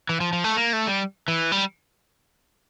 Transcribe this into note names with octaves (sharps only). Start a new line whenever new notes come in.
E3
F3
F3
A3
A#3
A3
G3
E3
G3